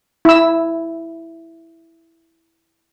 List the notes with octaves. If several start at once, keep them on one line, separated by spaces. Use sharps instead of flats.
E4 E6